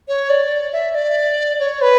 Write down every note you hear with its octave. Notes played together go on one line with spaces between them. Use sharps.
C#5
D5
E5
D5
C#5
B4